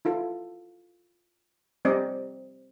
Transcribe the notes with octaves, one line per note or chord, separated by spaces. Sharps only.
E4 F4 A4
G3 C4 D5 D#5